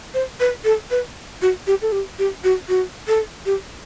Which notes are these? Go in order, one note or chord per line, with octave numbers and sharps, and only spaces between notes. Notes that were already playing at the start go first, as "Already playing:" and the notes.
C5
B4
A4
B4
F#4
G4
A4
G4
G4
F#4
F#4
A4
G4